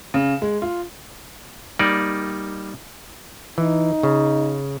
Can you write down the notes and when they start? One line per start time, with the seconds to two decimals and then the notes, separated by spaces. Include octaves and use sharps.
0.14 C#3
0.42 G#3
0.62 F4
1.79 G3 A#3 D#4 D5
3.58 E3 D#4
4.03 C#3